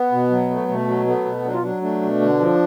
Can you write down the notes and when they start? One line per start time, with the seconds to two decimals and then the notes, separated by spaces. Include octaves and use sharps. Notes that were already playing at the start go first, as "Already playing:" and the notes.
Already playing: B3
0.12 B2
0.31 F#3
0.50 A3
0.68 B2 A3
0.87 F#3
1.07 A3 B3
1.25 B2
1.45 F#3 D4
1.54 F4
1.62 F#3 D4
1.82 A3 D4
2.02 B2
2.21 D3
2.40 F3